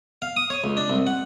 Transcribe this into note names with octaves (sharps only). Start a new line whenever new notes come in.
F5
D#6
C#5
C#2
D4
C2
F#5